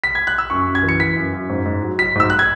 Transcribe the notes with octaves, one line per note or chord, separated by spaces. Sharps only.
B6
G#6
F#6
E6
F#2 C#6
F#2
G#6
E3
C#7
E3 B6
F#2
F#2
G#2
G#2
F#3
F#3 B6
G#2 E6
F#6
G#6